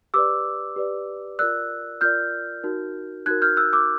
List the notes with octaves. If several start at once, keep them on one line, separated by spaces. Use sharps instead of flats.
G4 B4 D5 D6 E6
G4 B4 D5
F4 A#4 D5 E6 F#6
F4 A#4 D5 F6 G6
D#4 F#4 A#4
D#4 F#4 A#4 F#6 G#6
F6 G6
E6 F#6
D6 E6